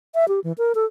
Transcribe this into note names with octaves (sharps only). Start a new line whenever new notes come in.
E5
G4
E3
A#4
A4